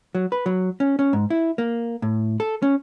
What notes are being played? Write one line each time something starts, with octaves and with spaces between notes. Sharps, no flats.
F#3
B4
F#3
C#4
C#4
G#2
E4
A#3
A2
A4
C#4